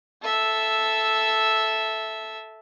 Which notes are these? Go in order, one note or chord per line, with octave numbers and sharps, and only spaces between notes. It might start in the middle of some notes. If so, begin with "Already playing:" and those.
A4 E5